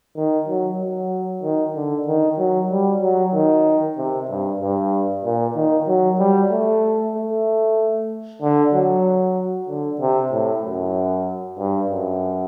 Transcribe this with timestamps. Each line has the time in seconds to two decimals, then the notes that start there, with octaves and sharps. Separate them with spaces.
0.17 D#3
0.48 F#3
0.81 F#3
1.43 D#3
1.75 D3
2.07 D#3
2.38 F#3
2.70 G3
3.02 F#3
3.34 D#3
3.98 C3
4.30 G2
4.61 G2
5.25 A#2
5.55 D#3
5.87 F#3
6.19 G3
6.51 A3
7.15 A3
8.42 D3
8.74 F#3
9.68 D3
10.01 C3
10.32 A2
10.64 F#2
11.58 G2
11.90 F#2